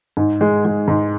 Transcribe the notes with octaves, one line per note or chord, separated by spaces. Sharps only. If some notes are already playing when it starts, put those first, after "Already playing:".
G#2
G#3
G#3
G#2